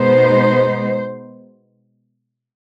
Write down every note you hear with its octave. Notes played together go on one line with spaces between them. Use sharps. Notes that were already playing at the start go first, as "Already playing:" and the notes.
Already playing: B2 G#3 B3 D#4 C5